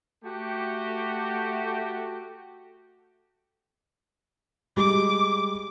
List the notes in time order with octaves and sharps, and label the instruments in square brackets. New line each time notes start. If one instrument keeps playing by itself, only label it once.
[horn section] A3 F#4 G4
[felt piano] G3 G#3 G4 [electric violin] D6